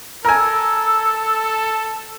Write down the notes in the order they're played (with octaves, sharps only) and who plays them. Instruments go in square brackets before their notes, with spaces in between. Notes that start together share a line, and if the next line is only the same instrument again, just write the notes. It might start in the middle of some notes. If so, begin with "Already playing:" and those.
[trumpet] A4 [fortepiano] A#4 G#5 [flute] E6